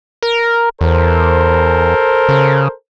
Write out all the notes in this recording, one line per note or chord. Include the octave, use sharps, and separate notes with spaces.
A#4
E2 A4 A#4 C5
C#3